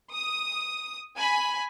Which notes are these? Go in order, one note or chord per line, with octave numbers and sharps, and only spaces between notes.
D#6
G#5 B5